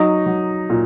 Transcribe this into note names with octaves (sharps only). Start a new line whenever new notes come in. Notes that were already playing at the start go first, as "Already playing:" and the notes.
Already playing: F#3 D#4
F#3
A#2